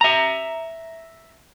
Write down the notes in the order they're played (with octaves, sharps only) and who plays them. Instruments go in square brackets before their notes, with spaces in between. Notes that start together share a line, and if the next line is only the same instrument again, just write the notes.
[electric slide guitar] E5 A#5